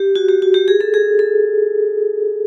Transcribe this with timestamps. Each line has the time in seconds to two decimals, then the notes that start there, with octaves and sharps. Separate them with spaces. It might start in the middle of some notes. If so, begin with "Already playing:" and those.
Already playing: G4
0.15 F#4
0.28 G4
0.42 F#4
0.54 G4
0.68 G#4
0.81 A4
0.94 G#4
1.19 A4